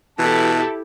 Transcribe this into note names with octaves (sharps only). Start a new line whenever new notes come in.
B2 E3 E4 G4 A4 A5